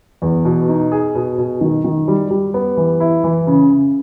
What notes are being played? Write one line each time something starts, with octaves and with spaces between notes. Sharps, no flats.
E2
B2
D#4
G#4
B2
B2
D#3
D#3
G3
G3
B3
E3
E4
E3
C#3
C#3